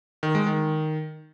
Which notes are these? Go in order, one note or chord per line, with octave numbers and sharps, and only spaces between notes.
D#3
G#3
D#3